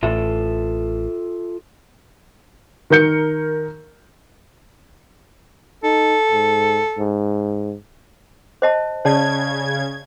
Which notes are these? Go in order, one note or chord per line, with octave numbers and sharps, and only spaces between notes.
A1 F4 A4 E5
D#3 A#4 G6 C#7
D#4 A4
G#2
G#2
C5 D#5 A5
C#3 C#5 D5 A5 G#6